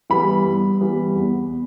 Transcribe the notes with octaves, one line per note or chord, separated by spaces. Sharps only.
E3 G3 B3 B5
G2
E3 G3 B3
E2